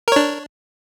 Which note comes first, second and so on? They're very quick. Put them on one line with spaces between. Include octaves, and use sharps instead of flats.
A#4 C#5 D4